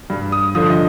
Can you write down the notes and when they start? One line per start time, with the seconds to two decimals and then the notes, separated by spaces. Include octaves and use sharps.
0.10 G2
0.32 D#6
0.55 D3 F3 D#6
0.70 D#5